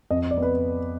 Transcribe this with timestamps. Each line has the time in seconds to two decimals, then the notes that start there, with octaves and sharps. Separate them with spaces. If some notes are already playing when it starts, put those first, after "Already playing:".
0.10 F2 D#5
0.31 D5
0.37 B3
0.42 B4